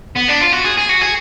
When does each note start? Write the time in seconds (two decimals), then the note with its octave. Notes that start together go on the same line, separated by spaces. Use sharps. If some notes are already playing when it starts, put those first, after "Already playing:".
0.16 B3
0.28 D4
0.40 F4
0.52 F#4
0.64 G#4
0.77 G#4
0.89 F#4
1.01 G#4